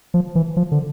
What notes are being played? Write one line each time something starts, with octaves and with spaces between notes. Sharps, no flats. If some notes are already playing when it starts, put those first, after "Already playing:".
F3
E3
F3
D3